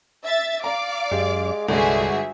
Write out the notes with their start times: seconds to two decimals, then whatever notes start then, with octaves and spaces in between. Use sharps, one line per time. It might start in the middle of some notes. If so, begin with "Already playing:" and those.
0.25 E5 A6
0.64 D5 F5 A#5 D6
1.11 F#2 G#3 G4
1.68 G1 C2 D3 G#3 F#4 G#4 E5